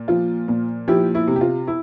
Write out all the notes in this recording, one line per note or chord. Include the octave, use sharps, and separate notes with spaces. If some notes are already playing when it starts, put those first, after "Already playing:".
Already playing: A#2
F3 F4
A#2
F3 E4 G4
E4
C3
G4
F4
E4